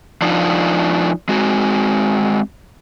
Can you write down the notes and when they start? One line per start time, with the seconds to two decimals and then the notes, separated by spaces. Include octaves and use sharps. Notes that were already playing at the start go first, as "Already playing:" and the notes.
0.22 F3 D4 D#4 F4
1.29 G#3 C4 F#4